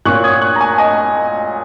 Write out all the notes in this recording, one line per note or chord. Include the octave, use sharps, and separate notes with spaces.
A#2 A#3 C#4 C#6 F#6
D#6 G#6
C#6 F#6
A#5
G#5 C#6
D#5 G#5